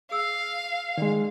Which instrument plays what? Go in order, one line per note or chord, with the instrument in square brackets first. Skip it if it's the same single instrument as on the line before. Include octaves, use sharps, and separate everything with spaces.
[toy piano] G#4 E6 [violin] F5
[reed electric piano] D#3 G#3 [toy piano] D5 G5 B5